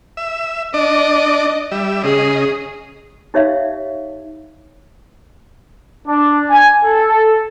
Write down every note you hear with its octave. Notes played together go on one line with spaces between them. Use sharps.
E5
D4 D5 D#5
G3 E5
C#3 G#4 D#5
D#4 G4 C#5 D5 E5 F5
D4
G#5
A4